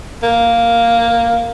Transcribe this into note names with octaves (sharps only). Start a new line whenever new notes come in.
A#3